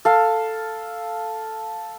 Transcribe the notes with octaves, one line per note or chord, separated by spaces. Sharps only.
A4 F5